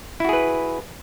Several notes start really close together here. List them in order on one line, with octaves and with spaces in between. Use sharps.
E4 F#4 G#4 B4